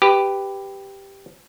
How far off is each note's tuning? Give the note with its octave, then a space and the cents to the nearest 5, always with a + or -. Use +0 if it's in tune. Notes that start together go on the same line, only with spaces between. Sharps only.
G4 +0 B4 +10